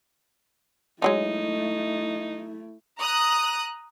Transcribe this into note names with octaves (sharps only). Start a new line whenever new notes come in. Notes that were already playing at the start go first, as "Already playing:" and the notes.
F3 F#3 G#3 A3 D#4 E4
A#5 D#6 F#6